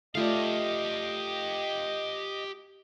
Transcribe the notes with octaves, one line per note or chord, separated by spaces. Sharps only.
A3 F4 G4 D5 D#5 F5